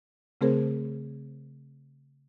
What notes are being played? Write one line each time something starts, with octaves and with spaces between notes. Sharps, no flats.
C#3 A3 C4 G#4 A#4 C5